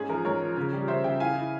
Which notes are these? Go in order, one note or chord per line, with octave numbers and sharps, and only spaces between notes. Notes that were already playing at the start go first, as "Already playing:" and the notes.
Already playing: G#2 C#4 G#4
F3 A#4
G#2 A#4 C#5
F3
C#3
G3
C#3 C5 E5
C#3 E5 G5
E4 F5 G#5
E4